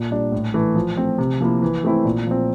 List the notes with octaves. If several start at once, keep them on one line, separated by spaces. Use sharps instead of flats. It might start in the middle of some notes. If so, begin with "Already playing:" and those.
Already playing: A#2
G3 D4
A2
E3 A3
F3
A3 C4
C3
F3 A#3 E4
E3
A3 C4 E4
A#2
F3 C4